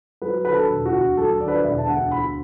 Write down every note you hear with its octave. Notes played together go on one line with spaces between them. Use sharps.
F#3 B4
D3 B4
A4
E1
F#4
D2
F#3 A4
D3 D5
B4
D5
E1 E5
A5
D2 F#5
D2 B5